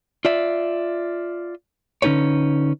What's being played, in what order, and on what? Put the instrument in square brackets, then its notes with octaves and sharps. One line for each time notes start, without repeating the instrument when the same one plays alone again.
[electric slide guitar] F4 D5 E5
D3 C#4 D#4 G4 B4 C#5